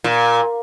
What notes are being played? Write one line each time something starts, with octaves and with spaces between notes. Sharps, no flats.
A#2